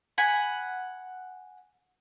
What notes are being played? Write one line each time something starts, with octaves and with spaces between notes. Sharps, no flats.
F#5 G#5 B5